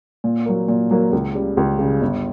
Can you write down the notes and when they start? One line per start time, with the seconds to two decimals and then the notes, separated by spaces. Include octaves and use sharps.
0.24 A#2
0.46 F#3 A#3
0.68 A#2
0.91 F#3 A#3
1.13 C#2
1.35 C#3 G3
1.57 C#2
1.79 C#3 G3
2.01 G1